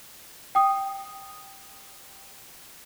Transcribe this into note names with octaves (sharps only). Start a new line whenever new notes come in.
G5 D#6